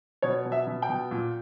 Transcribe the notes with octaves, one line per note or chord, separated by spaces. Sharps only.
B2 C#5
B2
E5
B2
G5
B2
A#2